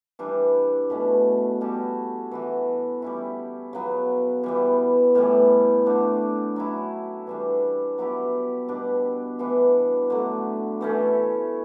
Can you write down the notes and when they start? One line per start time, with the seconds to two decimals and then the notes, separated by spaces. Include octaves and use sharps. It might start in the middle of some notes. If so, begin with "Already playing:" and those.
0.19 E3 G3 D4
0.90 B2 A3 C#4
1.61 G3 C#4 F#4 A4
2.31 E3 B3 F#4
3.02 G3 C#4 E4
3.73 C#3 F#3 B3
4.44 E3 G3 B3
5.15 A2 E3 G3 C#4
5.86 D3 A3 D4
6.56 F#3 C#4 E4
7.27 E3 G3 D4
7.98 F#3 B3 E4 G4
8.69 B2 G3 D4
9.39 E3 B3 D4
10.10 D3 F#3 A3
10.81 E3 A3 C#4